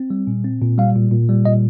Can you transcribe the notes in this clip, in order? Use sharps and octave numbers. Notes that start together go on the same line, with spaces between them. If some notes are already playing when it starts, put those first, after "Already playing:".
Already playing: C4
G3
A#2
C4
A#2
G3 F5
A#2
A#2
G3
A#2 D#5